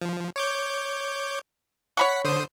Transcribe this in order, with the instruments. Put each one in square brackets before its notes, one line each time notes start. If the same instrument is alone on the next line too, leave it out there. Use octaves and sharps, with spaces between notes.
[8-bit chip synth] F3
C#5 D6 G6
[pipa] C#5 B5 C#6 [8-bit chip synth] F#5 B6
[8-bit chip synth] D3 C5 D#6